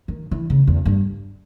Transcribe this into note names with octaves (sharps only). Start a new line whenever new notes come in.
D#3
E3
C#3
E2
G2